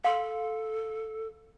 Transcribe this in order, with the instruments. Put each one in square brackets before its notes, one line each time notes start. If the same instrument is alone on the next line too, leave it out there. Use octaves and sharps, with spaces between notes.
[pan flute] A4 [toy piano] F5 C6